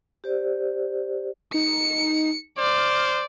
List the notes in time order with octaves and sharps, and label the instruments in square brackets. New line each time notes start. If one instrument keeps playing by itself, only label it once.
[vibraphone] G4 C5 D5
[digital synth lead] D#4 [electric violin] C#7
[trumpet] C5 [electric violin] D5 [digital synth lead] F6